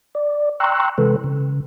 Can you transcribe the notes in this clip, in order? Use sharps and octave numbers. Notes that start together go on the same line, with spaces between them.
D5
G5 A#5 C6 C#6 E6 F#6
C3 E3 G#3 A4 B4
C#3